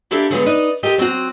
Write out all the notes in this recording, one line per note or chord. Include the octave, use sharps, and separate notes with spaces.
A#3 D4 E4 G4 A4 E5
D3 F3 F#3 G#3 B3
D#4 B4 D5 D#5
F4 G4 A4 A#4 D#5
F#3 C4 F4 F#4